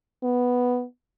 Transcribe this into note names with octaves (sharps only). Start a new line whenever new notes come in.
B3